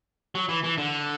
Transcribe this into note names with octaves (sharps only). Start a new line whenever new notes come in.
F#3
E3
E3
D3